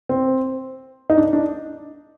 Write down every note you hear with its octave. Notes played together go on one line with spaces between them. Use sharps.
C4
D#4
D4
D4